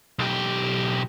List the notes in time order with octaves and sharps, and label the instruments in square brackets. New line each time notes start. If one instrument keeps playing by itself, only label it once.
[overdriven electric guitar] B1 G4